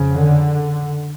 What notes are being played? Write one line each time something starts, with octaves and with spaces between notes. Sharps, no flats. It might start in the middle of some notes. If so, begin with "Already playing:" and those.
Already playing: F2 C#3
D3